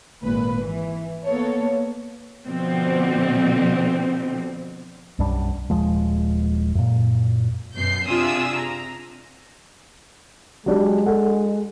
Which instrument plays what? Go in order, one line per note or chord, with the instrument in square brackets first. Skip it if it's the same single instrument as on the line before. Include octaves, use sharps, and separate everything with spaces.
[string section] G#1 A#2 B4
E3
A#3 B3 A4 C#5
B2 D3 F3 C4
[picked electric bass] B1 F#2 G3 D4
D#1 F3 G#3
F#2 A#2
[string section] F#2 B2 G6 C7
C3 D4 F4 G#4 D#6 E6
A#5
[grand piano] F#3 D4 G4 [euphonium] G#3
[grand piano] A4 F#5